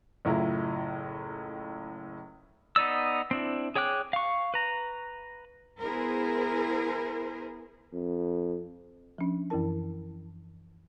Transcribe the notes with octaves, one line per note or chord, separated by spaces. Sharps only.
F#1 A2 E4 F4 A#5
B3 D#4 D5 E6
C4 D4 E4
G#4 C#5 G5 D6 F#6
F5 C#6
B4 A#5
B3 E4 G#4 A#4 C5
F2
F3 C#4 D4
F#2 E3 C#4 E4 A#4 A5